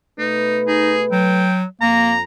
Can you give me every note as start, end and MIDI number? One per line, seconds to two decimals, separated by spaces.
0.19 1.49 47
0.19 1.49 57
0.19 0.59 63
0.19 1.49 71
0.68 0.95 63
0.68 1.02 68
1.12 1.65 54
1.12 1.57 79
1.81 2.23 41
1.81 2.14 58
1.81 2.22 82